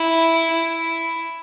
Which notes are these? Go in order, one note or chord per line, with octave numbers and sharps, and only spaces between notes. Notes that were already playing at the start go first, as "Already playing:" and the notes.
Already playing: E4
E4